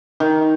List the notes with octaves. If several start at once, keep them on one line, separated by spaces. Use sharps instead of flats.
D#3